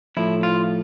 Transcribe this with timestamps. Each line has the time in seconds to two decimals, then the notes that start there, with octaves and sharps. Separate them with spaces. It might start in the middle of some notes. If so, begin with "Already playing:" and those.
0.17 A2 F3 E4
0.43 F4